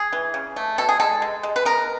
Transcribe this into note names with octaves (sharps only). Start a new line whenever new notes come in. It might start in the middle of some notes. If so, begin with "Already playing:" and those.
Already playing: G#4
E3
C#3
A3
B2 A4
G#4
G#3 A4
G#3
G#3
B4
B3 A#4